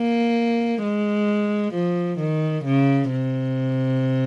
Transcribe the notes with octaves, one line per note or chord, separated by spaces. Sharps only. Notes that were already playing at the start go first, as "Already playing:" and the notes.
Already playing: A#3
G#3
F3
D#3
C#3
C3